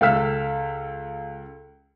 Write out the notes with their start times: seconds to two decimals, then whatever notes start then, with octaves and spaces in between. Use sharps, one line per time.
0.01 C#2 A4 F5 E6 B6